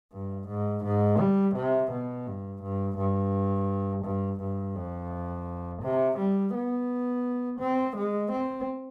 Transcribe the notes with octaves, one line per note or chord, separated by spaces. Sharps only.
G2
G#2
G#2
G3
C3
B2
G2
G2
G2
G2
G2
F2
C3
G3
B3
C4
G#3
C4